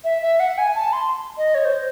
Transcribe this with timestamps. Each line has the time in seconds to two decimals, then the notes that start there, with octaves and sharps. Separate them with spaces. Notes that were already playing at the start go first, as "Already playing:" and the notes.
0.04 E5
0.22 E5
0.40 F#5
0.58 G#5
0.75 A5
0.93 C6
1.38 D#5
1.55 C#5
1.65 C5